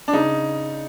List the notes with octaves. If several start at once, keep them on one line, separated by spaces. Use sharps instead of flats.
D4
C#3 D#4